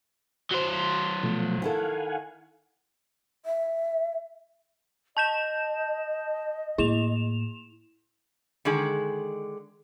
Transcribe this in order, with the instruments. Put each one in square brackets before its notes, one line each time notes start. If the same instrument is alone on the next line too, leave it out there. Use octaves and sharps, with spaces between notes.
[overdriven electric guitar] F#3 C5
[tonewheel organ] B2 F3 A3
[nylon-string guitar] D#3 E4 A4 [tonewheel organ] F5 F#5 G#5
[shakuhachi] E5
[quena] D#5 [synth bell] A5 G6 E7
[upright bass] A2 A#3 [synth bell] E4 E7 F7
[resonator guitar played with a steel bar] D3 D#3 G#3 G#4